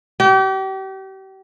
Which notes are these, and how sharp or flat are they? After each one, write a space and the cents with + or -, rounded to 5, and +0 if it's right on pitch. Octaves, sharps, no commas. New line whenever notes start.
G4 -35